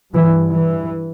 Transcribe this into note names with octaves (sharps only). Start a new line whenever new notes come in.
G2 E3
E3